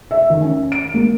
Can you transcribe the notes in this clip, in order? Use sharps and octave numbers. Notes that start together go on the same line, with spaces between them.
E5
D#3
C#4
D7
A#3